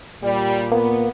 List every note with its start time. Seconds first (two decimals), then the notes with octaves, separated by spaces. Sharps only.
0.23 A#2 G3
0.72 A#3 B3